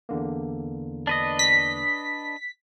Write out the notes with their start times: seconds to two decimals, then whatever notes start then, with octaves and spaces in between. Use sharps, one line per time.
0.09 E2 D3 A#3
1.07 D4 B4 D#5
1.39 B6